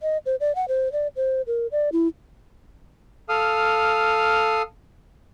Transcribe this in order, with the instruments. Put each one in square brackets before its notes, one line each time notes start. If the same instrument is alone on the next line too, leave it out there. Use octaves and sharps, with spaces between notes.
[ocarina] D#5
C5
D5
F#5
C5
D5
C5
A#4
D5
E4
[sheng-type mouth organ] A4 F5 D#6 F6